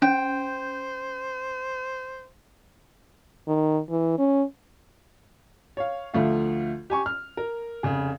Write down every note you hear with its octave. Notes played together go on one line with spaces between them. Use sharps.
C#4 C5 G5
D#3
E3
C#4
C#5 F5
D2 F3 A3 F5
G4 G#5 C#6
F6
A#4
F1 C#3 G#4